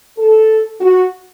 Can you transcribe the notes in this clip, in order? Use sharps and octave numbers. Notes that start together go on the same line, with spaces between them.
A4
F#4